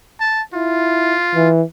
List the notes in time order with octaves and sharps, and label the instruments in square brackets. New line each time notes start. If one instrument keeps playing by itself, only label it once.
[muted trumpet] A5
[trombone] E4 [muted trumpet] F4
[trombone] E3